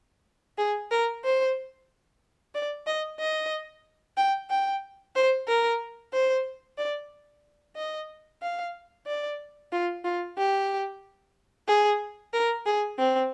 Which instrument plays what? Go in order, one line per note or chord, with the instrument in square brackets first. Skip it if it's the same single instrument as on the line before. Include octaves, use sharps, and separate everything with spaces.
[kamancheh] G#4
A#4
C5
D5
D#5
D#5
G5
G5
C5
A#4
C5
D5
D#5
F5
D5
F4
F4
G4
G#4
A#4
G#4
C4